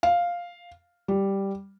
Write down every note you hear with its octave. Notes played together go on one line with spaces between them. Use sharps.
F5
G3